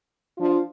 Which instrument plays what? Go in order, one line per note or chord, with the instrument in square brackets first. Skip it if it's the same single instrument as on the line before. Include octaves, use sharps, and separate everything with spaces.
[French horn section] F3 D4 F4